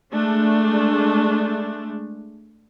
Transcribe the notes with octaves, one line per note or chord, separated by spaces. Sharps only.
G#3 A3 D4